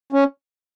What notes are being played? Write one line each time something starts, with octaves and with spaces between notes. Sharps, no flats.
C#4